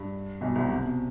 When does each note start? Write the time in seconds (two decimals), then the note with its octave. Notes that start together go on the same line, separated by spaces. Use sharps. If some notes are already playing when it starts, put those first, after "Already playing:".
Already playing: G2
0.41 B1 B2
0.55 C2 C3
0.69 C3
0.78 B2
0.86 C3